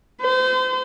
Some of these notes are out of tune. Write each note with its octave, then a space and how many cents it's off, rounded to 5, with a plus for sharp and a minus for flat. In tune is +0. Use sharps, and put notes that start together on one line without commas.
C5 -35